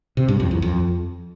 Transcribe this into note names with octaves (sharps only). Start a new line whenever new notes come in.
C3
G2
F2
E2
F2